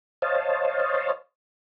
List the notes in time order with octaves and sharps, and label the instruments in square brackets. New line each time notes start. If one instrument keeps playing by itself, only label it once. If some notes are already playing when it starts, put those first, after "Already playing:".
[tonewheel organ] C5 C#5 D#5 F5 A5